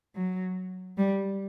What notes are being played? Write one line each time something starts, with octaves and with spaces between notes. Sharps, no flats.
F#3
G3